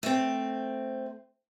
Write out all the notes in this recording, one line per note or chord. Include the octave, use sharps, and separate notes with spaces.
A3 C4